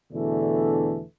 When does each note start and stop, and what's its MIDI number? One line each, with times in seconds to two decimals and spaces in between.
0.13 1.03 40
0.13 1.03 47
0.13 1.03 50
0.13 1.03 52
0.13 1.03 57
0.13 1.03 62